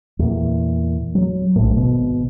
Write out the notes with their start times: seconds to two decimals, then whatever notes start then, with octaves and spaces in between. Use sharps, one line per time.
0.19 E2 A#2
1.15 F#3
1.56 A#1 A2
1.76 G#1 B2